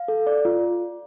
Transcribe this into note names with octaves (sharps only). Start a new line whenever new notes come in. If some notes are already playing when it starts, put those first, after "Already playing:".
Already playing: F5
A4
D5
F4